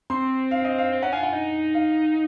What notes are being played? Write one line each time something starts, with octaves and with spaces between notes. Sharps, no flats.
C4 C6
F5
D#5
F5
C4
C#4 F#5
F4 G#5
F4 F#5
D#4
F5